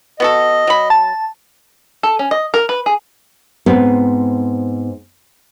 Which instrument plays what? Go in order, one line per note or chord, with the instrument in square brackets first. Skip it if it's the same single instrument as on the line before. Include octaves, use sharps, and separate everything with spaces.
[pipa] B3 F#4 A4 [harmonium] D#5
[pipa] F#3 B5
[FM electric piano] A5
[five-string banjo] A4
C#4
D#5
A#4
B4
G#4
[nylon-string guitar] G#2 B3 C4